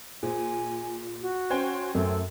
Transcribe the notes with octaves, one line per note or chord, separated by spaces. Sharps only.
A#2 G#4 C5 G#5
F#4
C#4 C5 G5
F#2 A3 A4